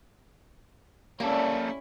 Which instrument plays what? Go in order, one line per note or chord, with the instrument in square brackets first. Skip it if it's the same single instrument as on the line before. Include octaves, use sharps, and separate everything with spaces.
[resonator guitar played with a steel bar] G3 [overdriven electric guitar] A#3 A4 [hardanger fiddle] C#4 E4